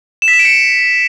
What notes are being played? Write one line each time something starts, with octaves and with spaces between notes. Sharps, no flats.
E7
B6
E7
D7
C#7